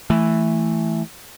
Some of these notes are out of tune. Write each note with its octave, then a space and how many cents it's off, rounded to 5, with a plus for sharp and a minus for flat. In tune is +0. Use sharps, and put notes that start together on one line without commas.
E3 +0 A3 +0